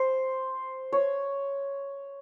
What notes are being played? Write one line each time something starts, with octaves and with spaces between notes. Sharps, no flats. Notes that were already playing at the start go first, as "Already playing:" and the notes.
Already playing: C5
C#5